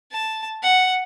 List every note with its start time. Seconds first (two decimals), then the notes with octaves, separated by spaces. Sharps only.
0.12 A5
0.62 F#5